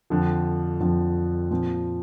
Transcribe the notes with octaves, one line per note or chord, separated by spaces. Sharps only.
F2 D3 F3
F2 D3 F3
A#2 F3 C4